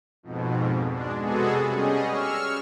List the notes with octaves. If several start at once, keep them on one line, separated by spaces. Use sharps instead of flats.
F2 G#2 B2
G#3 D4
C3 G#3 B3 F#4 G#4 A4
G3 C#4 G#4 D#5
C#6 E6 F6